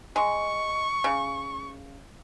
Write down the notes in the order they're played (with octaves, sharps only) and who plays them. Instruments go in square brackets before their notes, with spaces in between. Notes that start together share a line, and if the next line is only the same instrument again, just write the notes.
[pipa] G#3 [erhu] C#6
[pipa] C#3